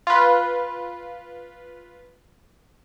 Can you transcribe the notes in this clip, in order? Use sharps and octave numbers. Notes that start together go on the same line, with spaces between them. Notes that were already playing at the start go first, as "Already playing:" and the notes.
F4 B4